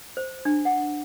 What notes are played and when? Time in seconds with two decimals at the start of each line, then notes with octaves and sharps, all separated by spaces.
0.17 C5
0.45 D4
0.65 F#5